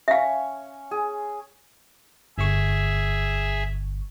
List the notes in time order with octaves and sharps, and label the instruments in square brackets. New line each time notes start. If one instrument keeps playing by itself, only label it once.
[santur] C#4 C#5 [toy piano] E5 F5
[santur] G#4
[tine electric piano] G1 C#6 [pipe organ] G#4 E5